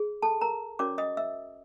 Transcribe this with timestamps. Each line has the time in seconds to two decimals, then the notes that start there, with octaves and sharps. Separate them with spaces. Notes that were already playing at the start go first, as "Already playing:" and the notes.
Already playing: G#4
0.22 A4 A5
0.41 A#4 A#5
0.79 C#4 F#4 A#4 C#5 D5 D6
0.98 D#5 D#6
1.17 E5 E6